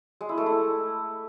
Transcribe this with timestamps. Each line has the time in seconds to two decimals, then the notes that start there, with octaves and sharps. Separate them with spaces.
0.21 G#3
0.29 E4
0.38 A3
0.46 E4